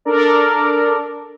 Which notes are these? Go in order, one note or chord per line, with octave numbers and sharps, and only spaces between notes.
D4 A4 A#4 D5